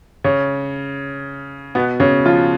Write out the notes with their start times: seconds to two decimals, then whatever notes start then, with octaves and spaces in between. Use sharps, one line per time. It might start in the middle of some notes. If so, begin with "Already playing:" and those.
0.24 C#3 C#4
1.75 B2 B3
2.00 C#3 C#4
2.26 F3 F4